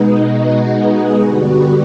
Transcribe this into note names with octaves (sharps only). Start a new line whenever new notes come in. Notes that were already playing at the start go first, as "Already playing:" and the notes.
Already playing: B2 G#3 B3 D#4
F#4
G#4
G2 D3 G3 B3 F#4